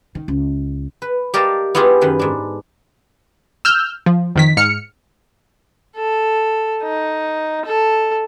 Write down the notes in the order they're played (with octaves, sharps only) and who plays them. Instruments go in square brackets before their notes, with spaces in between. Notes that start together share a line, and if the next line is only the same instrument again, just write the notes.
[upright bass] D#3
C#2
[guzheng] B4
G4 A#4 D5 D#5 F5 A5
B3 E4 F4 G4 G#4
F#2 D#3 B4
G#2 D4
[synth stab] E6 F6 G6
F3
F2 D#3 B6
G#2 F6 C#7
[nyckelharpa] A4
D#4
A4